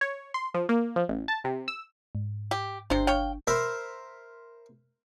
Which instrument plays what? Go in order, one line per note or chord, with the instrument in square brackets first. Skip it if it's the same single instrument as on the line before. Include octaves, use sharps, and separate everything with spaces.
[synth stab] C#5
C6
F3
A#3
F3
A1
A5
C3
E6
[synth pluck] G#2
[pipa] G4
[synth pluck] G1 D4 [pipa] C3 C5
[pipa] C#5 F5 G5
[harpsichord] A#4 C5 E5 B5